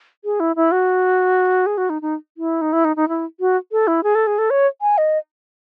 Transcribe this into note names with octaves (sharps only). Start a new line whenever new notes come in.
G#4
E4
E4
F#4
G#4
F#4
D#4
D#4
E4
D#4
E4
D#4
D#4
E4
F#4
A4
E4
G#4
A4
G#4
A4
C#5
G#5
D#5